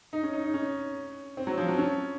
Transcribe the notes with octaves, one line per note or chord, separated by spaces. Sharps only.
D#4
C#4
D#4
D#4
C#4
C4
F#3
F3
F#3
C#4